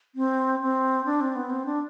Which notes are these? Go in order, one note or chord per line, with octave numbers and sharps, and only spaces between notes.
C4
C4
D4
C4
B3
C4
D4